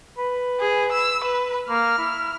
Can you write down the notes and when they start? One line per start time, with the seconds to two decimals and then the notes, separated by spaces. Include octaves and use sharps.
0.18 B4
0.60 G#4
0.92 E6
1.24 B4
1.69 A#3 F6
1.98 E4